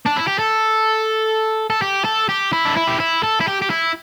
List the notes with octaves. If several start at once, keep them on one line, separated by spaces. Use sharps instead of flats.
D4
E4
G4
A4
A4
G4
A4
G4
E4
D4
E4
G4
E4
A4
E4
G4
G4
E4